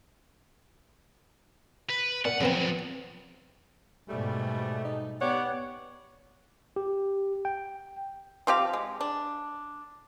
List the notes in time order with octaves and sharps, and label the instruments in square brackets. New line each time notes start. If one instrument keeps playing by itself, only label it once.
[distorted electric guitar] B4
[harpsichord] A#2 [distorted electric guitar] F#5
[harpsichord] C#3 B3 C4 [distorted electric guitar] F3 F#3
[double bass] G#2 B2 [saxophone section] G3 [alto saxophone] A3
[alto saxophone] D#4
[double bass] B3 [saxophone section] G4 D5 [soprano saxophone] C#5 [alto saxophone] F#5
[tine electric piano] G4
G5
[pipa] F3 C4 G4 F5
G#3
D4